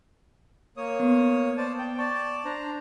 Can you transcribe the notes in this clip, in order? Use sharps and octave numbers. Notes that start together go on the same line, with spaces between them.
A#3 C#5 D#6
B3
C5 D5 A5
G5
D5 A5 C#6
D4 C5 A#5